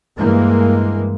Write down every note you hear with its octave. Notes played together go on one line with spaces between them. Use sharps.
G2 E3 G#3 A#3